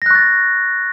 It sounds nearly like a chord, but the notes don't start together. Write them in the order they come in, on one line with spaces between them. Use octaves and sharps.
A#6 F#6 C#6 A6